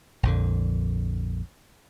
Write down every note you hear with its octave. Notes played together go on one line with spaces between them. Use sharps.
A#1 F2 D3